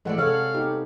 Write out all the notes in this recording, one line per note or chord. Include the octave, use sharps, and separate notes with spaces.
E3 G#3 A3 A4 D5 F#5
C3 A4 C#5 F5 F#5
B3 D#4 G4